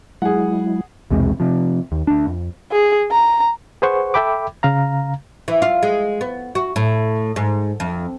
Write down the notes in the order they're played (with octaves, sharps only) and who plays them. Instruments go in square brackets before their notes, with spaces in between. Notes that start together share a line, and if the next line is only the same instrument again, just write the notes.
[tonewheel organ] F#3 G#3 E4 [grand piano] G#4 F#5
[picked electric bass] B1 E2 C3 G#3
C3 F3
D#2
D2 D4
F2
[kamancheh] G#4
A#5
[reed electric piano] G#4 B4 C5 F#5 C#6
A4 E5 G5 B5 D6
C#3 F5 A#5
[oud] E3
F4
G#3
B3
F#4
A2
G#2
F2